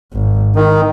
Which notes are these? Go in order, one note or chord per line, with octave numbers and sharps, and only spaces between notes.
G#1
D#3 D#4